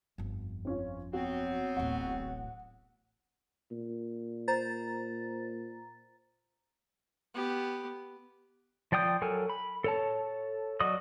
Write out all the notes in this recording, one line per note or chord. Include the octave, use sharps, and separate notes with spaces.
G1 F2
C4 C#4 F4
F#3 B3 C4 F#4
D1 A1 F#5
A#2
C5 A#5 A6
B3 G4
F3 D5 G5 D#6 G6
F#3 A4 A#4 G#5
B5
A4 C#5 A5
F#3 F#4 D5 D#5 D#6